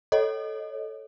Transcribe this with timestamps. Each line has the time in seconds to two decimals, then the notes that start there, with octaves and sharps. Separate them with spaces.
0.12 A4 C#5 D#5